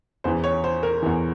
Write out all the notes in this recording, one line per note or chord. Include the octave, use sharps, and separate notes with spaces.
E2 E3 C5
C#5
C5
A#4
E2 E3